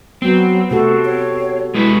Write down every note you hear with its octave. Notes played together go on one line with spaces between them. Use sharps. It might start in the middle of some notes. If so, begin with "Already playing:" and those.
F#3 B3 C4
C3 A3 F#4 A4
C#5
G#3 E4 G#4 B4